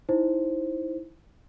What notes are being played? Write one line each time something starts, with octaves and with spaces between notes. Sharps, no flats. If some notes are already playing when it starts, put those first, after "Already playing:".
D#4 E4 C5